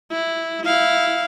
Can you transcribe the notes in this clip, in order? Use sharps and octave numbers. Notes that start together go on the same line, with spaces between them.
E4
E4 F5